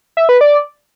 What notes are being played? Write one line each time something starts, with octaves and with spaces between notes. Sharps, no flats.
E5
B4
D5